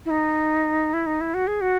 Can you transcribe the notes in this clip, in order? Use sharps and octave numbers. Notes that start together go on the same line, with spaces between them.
E4
D#4
E4
D#4
E4
F#4
G#4
F#4